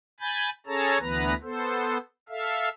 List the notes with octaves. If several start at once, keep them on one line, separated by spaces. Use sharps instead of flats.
G#5 B5 G6 A6
C#4 G#4 A4 C#5 A5 A#5
D2 E3 B3 B4 A#5
B3 A4 C5
A4 E5 F5